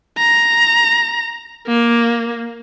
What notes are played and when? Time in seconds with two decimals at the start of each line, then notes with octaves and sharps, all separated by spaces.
0.18 A#5
1.67 A#3